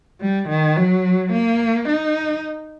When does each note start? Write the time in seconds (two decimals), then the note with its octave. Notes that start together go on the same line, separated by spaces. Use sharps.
0.21 G3
0.49 D#3
0.77 F#3
1.33 A#3
1.89 D#4